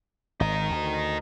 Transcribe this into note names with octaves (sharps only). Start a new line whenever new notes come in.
G#1 D#4 A#4
D2